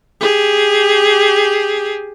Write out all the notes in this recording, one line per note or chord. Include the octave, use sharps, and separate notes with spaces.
G4 G#4